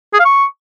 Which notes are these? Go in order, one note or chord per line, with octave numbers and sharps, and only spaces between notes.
G#4
F5
C#6